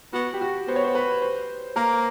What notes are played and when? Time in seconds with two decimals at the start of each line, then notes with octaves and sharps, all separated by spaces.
0.13 B3 F#4
0.34 G4
0.41 F#4
0.68 B3 C5
0.76 C#5
0.85 C5
0.95 B4
1.22 C5
1.76 A#3 A#4